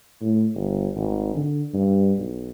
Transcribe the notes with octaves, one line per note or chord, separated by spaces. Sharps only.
A2
G1
G#1
D3
G2
B1